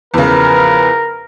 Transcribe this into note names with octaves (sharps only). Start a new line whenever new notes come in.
E2 C#3 F3 A#4 B4